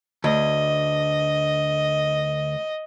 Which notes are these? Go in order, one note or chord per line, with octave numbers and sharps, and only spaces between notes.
D2 D#5